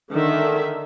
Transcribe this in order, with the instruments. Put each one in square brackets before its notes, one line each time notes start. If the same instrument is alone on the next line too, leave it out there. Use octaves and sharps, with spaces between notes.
[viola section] D3 D#3 E5